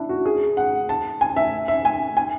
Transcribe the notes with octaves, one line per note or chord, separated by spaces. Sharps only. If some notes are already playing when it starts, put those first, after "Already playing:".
Already playing: D4 E4
F#4
G#4
F#5
A5
G#5
E5
E5
G#5
G#5